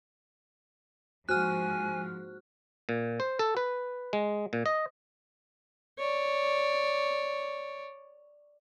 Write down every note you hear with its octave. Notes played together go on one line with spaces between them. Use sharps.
G#2 F3 A#3 F#4 C5 G#5 F6 F#6
A#2
C5
A4
B4
G#3
A#2
D#5
C#5 D5